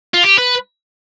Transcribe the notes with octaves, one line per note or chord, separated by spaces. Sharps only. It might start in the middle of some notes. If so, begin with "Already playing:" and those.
F4
G4
B4